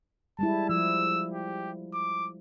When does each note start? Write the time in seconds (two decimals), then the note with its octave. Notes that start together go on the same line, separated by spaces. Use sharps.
0.39 G3 G#3 E4 A5
0.69 F3 E6
1.33 G4
1.94 D6